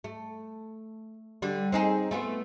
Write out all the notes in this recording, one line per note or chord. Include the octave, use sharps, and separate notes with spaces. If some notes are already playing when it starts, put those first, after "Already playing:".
A3
D3 G3
C4 D#4 G#4
A3 B3 F4